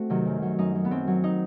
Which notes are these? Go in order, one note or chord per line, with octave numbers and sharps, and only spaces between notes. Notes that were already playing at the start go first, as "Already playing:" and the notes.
Already playing: A3 C4 F#4
C3 D#3 F#3
F#2
F#3
F#2 D#4
F#3
B3
F#2 C4
F#3
D#4